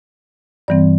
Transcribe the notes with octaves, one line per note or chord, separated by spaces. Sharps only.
G2 E3 G3 C4 D5